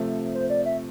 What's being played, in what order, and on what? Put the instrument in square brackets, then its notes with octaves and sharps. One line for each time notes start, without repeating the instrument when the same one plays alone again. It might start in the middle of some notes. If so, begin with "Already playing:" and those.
Already playing: [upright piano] C3 F3 A3
[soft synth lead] C5
D5
E5